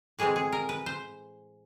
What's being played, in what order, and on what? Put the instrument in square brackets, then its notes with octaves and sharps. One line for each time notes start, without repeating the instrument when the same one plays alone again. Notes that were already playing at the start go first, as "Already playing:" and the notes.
[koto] A2 E3 G#3 C4 G#4
G#4
A#4
B4
C5